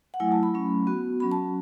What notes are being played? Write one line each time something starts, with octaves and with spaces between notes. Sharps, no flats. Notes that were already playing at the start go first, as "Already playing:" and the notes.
F#5
F#3 A3 E4 G#5
A5
B5
F#3 A3 C#4
B3 F#4
F#3 C#4 F#4 B5
A5